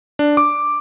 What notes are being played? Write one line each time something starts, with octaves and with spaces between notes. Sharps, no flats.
D4
D6